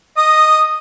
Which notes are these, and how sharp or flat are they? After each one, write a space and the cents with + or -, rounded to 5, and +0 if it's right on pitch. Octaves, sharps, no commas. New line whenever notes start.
D#5 +0 D#6 -10